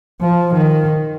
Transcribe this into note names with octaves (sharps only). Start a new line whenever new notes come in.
F3
D#3